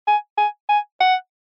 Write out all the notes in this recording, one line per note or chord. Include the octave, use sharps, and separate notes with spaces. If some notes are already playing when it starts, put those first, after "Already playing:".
G#5
G#5
G#5
F#5